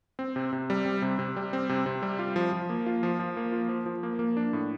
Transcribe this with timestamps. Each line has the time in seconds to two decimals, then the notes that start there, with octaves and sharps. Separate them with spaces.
0.19 C4
0.36 C3
0.53 C3
0.70 G3
0.85 C4
1.02 C3
1.19 C3
1.37 G3
1.53 C4
1.69 C3
1.86 C3
2.03 G3
2.19 F4
2.36 F3
2.53 F3
2.69 A#3
2.86 F4
3.03 F3
3.20 F3
3.37 A#3
3.52 F4
3.69 F3
3.86 F3
4.03 A#3
4.19 A#3
4.37 D4
4.53 A2